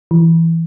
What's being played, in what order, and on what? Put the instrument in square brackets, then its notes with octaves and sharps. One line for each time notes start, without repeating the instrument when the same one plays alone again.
[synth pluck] E3